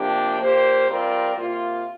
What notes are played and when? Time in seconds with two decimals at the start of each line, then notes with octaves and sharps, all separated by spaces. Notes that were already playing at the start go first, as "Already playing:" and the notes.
Already playing: C3 F3 A#3 D4 G4
0.40 A#2 A#3 G4 C5
0.88 G3 C4 F4 A#4 D5
1.36 C3 A#3 F4